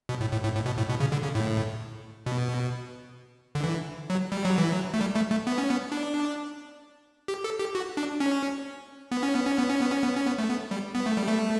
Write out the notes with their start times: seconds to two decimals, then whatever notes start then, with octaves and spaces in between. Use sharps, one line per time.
0.09 B2
0.21 A2
0.32 A2
0.44 A2
0.55 A2
0.66 B2
0.78 A2
0.89 B2
1.00 C#3
1.12 D3
1.23 C#3
1.35 A2
2.26 B2
3.55 D3
3.63 E3
4.10 F#3
4.32 G3
4.45 F#3
4.58 E3
4.71 F#3
4.94 A3
5.01 G3
5.16 A3
5.31 A3
5.47 B3
5.58 C#4
5.71 B3
5.92 D4
7.28 G4
7.44 A4
7.59 G4
7.75 F#4
7.97 D4
8.20 C#4
9.12 B3
9.23 C#4
9.35 B3
9.46 C#4
9.58 B3
9.70 C#4
9.81 B3
9.92 C#4
10.04 B3
10.15 C#4
10.26 B3
10.38 A3
10.49 B3
10.71 G3
10.95 B3
11.06 A3
11.17 G3
11.28 A3